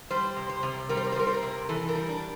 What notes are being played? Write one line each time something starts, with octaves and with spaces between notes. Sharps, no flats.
G3 C5
C3
C5
C3
G3 A#4
C5
A#4
C5
G3 A#4
C5
A#4
C3
E3 A4
A#4
G3
D4